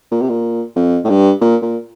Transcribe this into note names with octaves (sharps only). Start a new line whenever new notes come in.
A#2
C3
A#2
F2
A2
G2
A#2
A#2